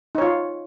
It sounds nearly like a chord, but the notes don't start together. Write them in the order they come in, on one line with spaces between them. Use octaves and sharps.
D#4 C#5 F4